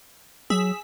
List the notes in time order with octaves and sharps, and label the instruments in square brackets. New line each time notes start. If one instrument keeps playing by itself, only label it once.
[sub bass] F#3 [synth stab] G#4 E6 B6